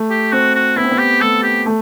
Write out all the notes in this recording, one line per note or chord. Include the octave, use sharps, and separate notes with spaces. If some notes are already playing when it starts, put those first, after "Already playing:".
Already playing: A3
G4
C4 F#4
F#4
B3 E4
C4
B3
G4
A3 A4
G4
A3